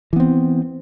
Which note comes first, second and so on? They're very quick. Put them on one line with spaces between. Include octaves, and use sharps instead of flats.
E3 B3 C4